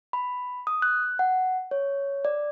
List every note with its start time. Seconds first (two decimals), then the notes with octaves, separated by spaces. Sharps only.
0.13 B5
0.67 D#6
0.82 F#6
1.19 F#5
1.71 C#5
2.25 D5